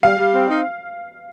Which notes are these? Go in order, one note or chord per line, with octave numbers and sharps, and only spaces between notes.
G3 F5
G3
C4
D#4